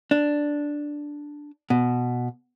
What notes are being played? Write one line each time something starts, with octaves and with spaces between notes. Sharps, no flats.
D4
B2